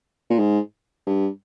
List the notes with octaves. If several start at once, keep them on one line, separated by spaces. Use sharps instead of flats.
A#2
G#2
G2